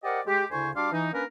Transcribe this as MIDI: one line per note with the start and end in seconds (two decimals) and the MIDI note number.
0.04 0.21 67
0.04 0.21 70
0.04 0.21 72
0.04 0.21 74
0.04 0.21 75
0.04 0.21 78
0.26 0.44 56
0.26 0.44 67
0.51 0.70 38
0.51 0.70 49
0.51 0.70 64
0.51 0.70 72
0.51 0.70 80
0.51 0.70 85
0.75 0.90 55
0.75 0.90 62
0.75 0.90 66
0.75 0.90 77
0.75 0.90 84
0.75 0.90 86
0.92 1.10 52
0.92 1.10 63
1.13 1.24 58
1.13 1.24 61
1.13 1.24 62
1.13 1.24 70
1.13 1.24 71